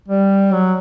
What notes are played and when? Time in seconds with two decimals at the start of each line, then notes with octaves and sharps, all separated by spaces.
0.08 G3
0.52 F#3